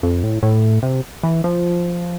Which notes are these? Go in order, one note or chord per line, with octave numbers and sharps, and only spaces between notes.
F2
A2
A2
C3
E3
F3